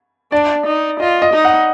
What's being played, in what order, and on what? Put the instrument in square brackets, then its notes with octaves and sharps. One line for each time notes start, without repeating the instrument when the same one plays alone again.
[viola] D4 [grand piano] D5
[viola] D#4
[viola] F4 [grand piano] D#5
[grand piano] D#5
[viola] D#4
[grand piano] F#5